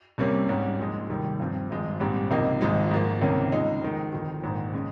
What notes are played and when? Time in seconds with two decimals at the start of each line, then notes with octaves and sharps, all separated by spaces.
0.18 C2 C3 G3 A#3 C#4
0.48 G#2 G3 C#4
0.79 A#1 A#2 F3 G#3 D#4
1.09 F1 D#2 D#3 G3
1.40 G2 F3 C4 F4
1.70 G#1 G2 F3 G#3
2.00 A#1 G#2 G3 C4 G4
2.31 C#2 C3 F3 A#3 D#4
2.61 G#1 G#2 F3 G#3 D#4
2.91 G#2 F3 A#3
3.22 C#2 C3 D#3 A#3 C#4
3.52 C#2 C#3 G#3 D#4
3.82 F2 D#3 G#3
4.13 G1 F2 D#3
4.43 A#1 G#2 D#3
4.73 C#3 G#3